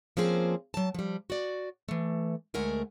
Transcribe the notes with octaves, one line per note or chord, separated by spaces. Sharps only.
F3 A#3 C4 C#4 G#4 C5
F#3 A5
F3 G3
F#4 D5
E3 A3
D2 G#3 A3 A#4 F#5 G#5